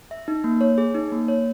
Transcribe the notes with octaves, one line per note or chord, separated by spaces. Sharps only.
E5
D#4
A#3
C#5
G#4
D#4
A#3
C#5